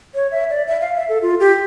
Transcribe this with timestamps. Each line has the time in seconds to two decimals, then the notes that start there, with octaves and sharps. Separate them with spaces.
0.15 C#5
0.32 E5
0.50 D5
0.67 E5
0.81 F5
0.95 E5
1.09 A4
1.22 F4
1.40 G4